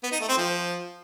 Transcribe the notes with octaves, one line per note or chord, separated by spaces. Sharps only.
B3
D#4
A3
C4
F3